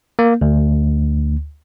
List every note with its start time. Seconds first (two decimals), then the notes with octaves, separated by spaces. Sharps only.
0.19 A#3
0.41 D2